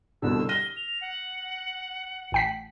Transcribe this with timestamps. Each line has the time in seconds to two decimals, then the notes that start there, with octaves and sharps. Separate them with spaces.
0.22 C2 B2 D3 E6
0.49 F6 A#6 D#7 G7
0.77 F7
1.01 F#5
2.32 A1 G5 B6